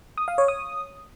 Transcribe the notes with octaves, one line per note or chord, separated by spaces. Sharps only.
D#6
F5
C#5
D#6